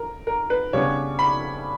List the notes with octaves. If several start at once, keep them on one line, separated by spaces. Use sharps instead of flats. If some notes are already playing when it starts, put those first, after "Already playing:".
Already playing: A#4
A#4
B4
C#3 G3 B3 D4 C#5
B5